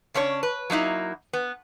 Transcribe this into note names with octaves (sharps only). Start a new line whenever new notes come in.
C#3 C#4 D4 C#5
B4
F#3 A#3 D#4 E4
B3